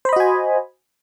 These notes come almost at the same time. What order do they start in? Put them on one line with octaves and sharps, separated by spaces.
C5 B5 D#5 F#4 G#5